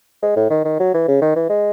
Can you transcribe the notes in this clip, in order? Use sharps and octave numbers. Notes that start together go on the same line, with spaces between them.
G#3
A2
D#3
D#3
F#3
E3
C#3
D#3
E3
G#3